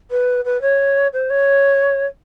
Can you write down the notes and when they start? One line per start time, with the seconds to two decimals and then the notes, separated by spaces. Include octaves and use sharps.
0.11 B4
0.45 B4
0.61 C#5
1.13 C5
1.30 C#5